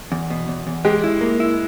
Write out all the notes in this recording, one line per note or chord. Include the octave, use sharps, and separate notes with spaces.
E2
B2
E2
E2
G#3 G4
E4
A#3
E4